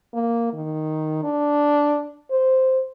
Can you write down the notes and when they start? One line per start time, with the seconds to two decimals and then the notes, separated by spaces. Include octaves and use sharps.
0.14 A#3
0.53 D#3
1.23 D4
2.31 C5